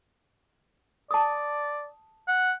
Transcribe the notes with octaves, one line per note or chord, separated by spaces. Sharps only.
D5 A5 D#6
F#5